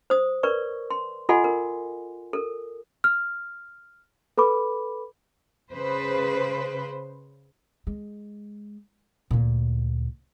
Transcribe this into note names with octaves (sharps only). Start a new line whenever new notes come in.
C5 D#6
A#4 B4 D5 C#6
C6
F4 A4 D#5 F#5 G#5 C6
A#4
A4 A#4
F6
A4 B4 B5 D6
C#3 B4 C5
G#3
D2 A#2